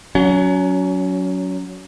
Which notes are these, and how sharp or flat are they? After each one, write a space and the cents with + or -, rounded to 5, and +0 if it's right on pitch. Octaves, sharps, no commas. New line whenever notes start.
F#3 +0 C#4 +25